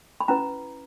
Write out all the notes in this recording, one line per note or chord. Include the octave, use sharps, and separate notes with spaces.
B5
C#4 E4 B4 A#5